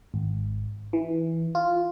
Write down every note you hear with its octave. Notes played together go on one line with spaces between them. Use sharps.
G#1
E3
F4